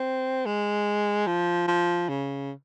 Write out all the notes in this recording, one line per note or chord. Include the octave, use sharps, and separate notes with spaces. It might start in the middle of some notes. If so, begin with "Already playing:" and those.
Already playing: C4
G#3
F3
F3
C#3